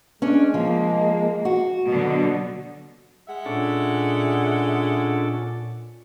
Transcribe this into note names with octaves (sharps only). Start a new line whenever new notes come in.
G#3 C#4 D4
F3 A#3
F#4
B2 D3 F#3
G#3 E5 F#5
A#2 C#4 D4 A4